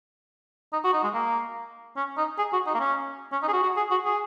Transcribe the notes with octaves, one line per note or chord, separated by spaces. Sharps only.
D#4
F#4
D#4
G#3
A#3
C#4
D#4
G#4
F#4
D#4
A#3
C#4
C#4
D#4
G#4
F#4
F#4
G#4
F#4
G#4